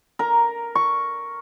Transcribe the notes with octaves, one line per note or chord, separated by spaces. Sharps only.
A#4 A#5
C#6